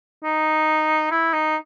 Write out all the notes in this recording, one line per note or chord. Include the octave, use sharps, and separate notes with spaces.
D#4
E4
D#4